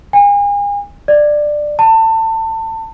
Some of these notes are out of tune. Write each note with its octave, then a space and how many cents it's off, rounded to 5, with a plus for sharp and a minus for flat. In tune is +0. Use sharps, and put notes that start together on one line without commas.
G#5 -40
D5 +15
A5 +25